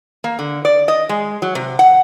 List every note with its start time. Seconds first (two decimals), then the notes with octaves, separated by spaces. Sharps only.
0.24 A#3
0.39 D3
0.65 D5
0.88 D#5
1.09 G#3
1.42 F#3
1.55 C3
1.79 F#5